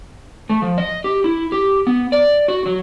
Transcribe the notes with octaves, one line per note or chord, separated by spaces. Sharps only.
A3
F3
D#5
G4
E4
G4
B3
D5
F#4
F#3